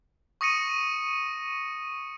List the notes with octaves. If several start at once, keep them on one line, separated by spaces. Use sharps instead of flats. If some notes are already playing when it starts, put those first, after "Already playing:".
C#6 D#6 A#6 C#7 D#7